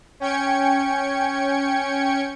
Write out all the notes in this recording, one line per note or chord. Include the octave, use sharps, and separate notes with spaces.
C#4 G5 G#6 C#7